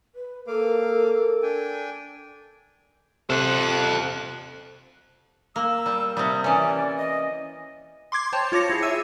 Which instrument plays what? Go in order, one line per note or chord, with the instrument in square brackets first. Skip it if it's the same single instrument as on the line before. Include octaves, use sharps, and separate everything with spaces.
[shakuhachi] B4
[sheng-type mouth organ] A#3 F5 D6 [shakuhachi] A4 [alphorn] A#4
[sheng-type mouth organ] D4 G5 G#5
[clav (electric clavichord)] C3 [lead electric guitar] A4 C5 [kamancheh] F#6
[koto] A#3 [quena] E6
[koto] G3
[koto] C3 G3 [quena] D#6
[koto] E3 C#4 [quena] D5
[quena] D#5
[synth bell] C6 D6 G#6
C5 C#5 G5 A5
F4 C#5 D6 A#6 C#7
E4 G#4
E5 E6 D#7